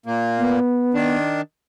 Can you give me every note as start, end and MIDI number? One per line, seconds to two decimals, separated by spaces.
0.06 0.59 46
0.06 0.59 58
0.38 1.17 59
0.94 1.41 51
0.94 1.41 62